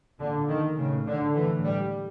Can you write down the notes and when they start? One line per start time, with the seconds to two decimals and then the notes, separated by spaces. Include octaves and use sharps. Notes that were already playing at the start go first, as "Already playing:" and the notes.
0.18 A#2 D3
0.48 D#3
0.77 A2 C#3
1.07 D3
1.35 A2 E3
1.64 G3